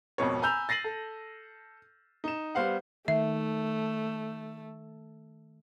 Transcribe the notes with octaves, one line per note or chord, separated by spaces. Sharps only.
G#1 F2 B2 C#5
G#5 A#5 B5 E6 G6 F7
A6 A#6 C7 D#7 F#7
A4
D#4 E7
G3 B3 C5 F5 F#5
D#3 A3 E5